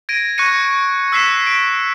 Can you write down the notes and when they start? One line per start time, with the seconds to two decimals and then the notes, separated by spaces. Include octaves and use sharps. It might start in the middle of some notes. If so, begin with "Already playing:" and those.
0.09 G#6 A#6 D7 D#7
0.38 C#6 F#6 G#6 A#6 C#7 D#7
1.12 E6 F#6 B6 C7 E7
1.47 D7